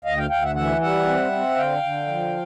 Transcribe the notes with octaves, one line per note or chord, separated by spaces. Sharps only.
D2 D#5 F5
F5 G5
D2 F5 G5
E5 F#5
E3 E5 F#5
G3 E5 F#5
C4
C4
D3 F5 G5
D3
F3